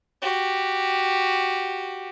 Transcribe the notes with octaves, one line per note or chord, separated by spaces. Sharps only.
F#4 G4